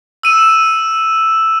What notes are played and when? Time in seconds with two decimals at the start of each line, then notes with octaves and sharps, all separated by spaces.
0.23 E6 D#7 E7